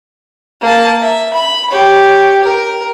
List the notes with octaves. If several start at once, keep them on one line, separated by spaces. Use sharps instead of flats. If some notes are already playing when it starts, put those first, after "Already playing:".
A#3 A5
E5
B5
G4 C#5
A#4